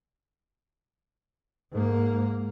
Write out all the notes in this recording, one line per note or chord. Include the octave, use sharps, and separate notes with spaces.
G#2 A#3